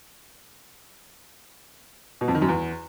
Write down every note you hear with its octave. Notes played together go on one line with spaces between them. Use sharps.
B2
F2
D#3
F#2
E2